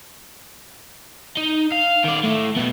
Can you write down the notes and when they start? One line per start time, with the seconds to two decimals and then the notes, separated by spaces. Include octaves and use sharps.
1.37 D#4
1.72 F5
2.04 D#3 D5
2.24 A3 E4
2.57 B2 B3